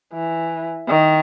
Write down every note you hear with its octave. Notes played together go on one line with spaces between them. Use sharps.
E3
D#3